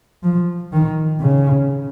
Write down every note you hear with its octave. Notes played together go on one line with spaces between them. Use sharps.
F3
D#3
C#3